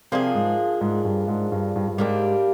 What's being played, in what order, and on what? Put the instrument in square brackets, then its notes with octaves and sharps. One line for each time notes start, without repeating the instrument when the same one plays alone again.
[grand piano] C3 [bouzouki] F3 A#3 D4 G#4
[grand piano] G#2
G#2
G2
G#2
G2
G2
G2
[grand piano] G#2 [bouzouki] G3 A#3 D4 G4